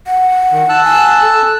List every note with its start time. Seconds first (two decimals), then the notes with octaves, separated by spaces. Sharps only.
0.07 F#5
0.52 D#3
0.69 A5 E6 F#6
0.84 G#5
1.22 A4